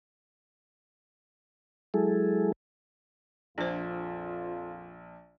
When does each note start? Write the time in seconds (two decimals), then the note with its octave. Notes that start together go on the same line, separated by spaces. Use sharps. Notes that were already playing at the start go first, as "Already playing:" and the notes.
1.94 F#3 G#3 E4 G#4 A4
3.58 A#1 F2 D4 F4 C5